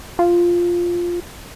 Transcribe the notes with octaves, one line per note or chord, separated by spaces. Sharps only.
F4